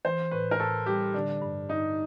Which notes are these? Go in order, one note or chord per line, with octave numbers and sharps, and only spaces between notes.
E3 C5
A2 B4
A#4
A2 A4
G3 G4
D3 D4
G2
G2 D#4